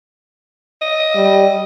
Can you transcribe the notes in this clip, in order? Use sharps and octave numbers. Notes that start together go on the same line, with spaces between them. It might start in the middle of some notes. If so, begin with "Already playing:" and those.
D#5
G3